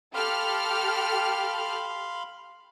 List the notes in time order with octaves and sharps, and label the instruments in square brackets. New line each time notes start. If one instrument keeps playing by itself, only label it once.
[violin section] G4 A4 F6 [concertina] F5 B5 C6